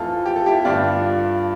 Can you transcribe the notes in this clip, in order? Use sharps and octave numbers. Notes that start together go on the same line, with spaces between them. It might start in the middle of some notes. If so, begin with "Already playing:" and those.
Already playing: F2 E3 A3 F4 A4
G4
A4
E4 G4
G2 D3 A3 D4 F4